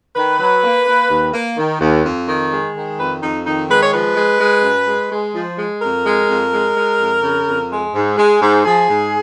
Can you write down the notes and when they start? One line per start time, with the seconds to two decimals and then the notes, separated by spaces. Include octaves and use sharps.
0.16 D#3 B4
0.40 F#3
0.63 A#3
0.87 A#3
1.10 D#2
1.33 A#3
1.58 D#3
1.81 D#2
2.04 F2
2.29 D#3
2.52 G#3
2.76 D#3
2.99 F2 B4
3.23 F2 D#4
3.46 D#3 D#4
3.70 G#3 B4
3.83 C#5
3.93 F3 B4
4.17 G#3
4.41 G#3
4.64 F#2
4.88 G#3
5.11 G#3
5.35 F3
5.58 G#3
5.82 F2 A#4
6.05 G#3
6.29 F2
6.52 G#3
6.76 G#3
7.00 F2
7.23 C#3
7.47 F2
7.70 G#3
7.94 G#2
8.18 G#3
8.41 G#2
8.65 F3 G#4
8.89 G#2